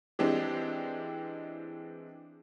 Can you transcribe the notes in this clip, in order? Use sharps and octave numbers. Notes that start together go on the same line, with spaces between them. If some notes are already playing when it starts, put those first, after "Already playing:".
E3 G#3 C4 D4 G4